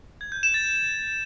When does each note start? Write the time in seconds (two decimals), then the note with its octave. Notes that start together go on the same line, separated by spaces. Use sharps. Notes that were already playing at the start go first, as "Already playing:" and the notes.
0.21 G#6
0.32 G6
0.43 E7
0.54 A6